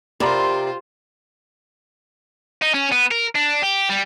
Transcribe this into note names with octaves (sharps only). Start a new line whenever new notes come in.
C3 F4 A#4 C5 D5 B5
D#4
C#4
B3
A#4
D4
G4
G3